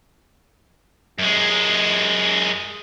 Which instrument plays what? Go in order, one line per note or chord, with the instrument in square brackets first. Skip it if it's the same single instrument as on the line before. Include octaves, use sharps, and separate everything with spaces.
[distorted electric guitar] F#2 G#3